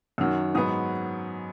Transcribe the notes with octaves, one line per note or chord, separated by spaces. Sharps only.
F#2 D#3 F#3 E6
G#2 F#3 B3 D#6